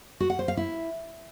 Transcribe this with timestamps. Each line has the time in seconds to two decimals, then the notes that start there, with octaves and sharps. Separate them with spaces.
0.20 F#4
0.30 F#5
0.39 C5
0.48 F5
0.57 E4